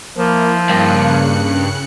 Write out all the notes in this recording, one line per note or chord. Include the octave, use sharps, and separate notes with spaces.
F3 A#3 E4
G2 C#3 A#3 F#6 C#7